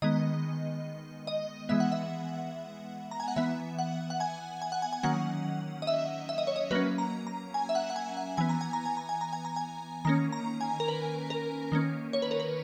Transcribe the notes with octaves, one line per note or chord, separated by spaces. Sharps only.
D#3 G#3 B3 D#5
D#5
E3 G#3 B3 E5
F#5
E5
A#5
G#5
F#5
E3 B3 E5
F#5
F#5
G#5
G#5
F#5
G#5
G#5
D#3 F#3 A#3 C#4 F#5
D#5
E5
E5
D#5
C#5
D#5
F#3 A#3 C#4 B4
A#5
A#5
G#5
E5
F#5
F#5
G#5
F#5
E3 B3 G#5
A#5
G#5
A#5
G#5
A#5
G#5
A#5
G#5
A#5
G#5
D#3 A#3 C#4 A#5
A#5
G#5
A#4
B4
A#4
D#3 A#3 C#4
C#5
B4
A#4
B4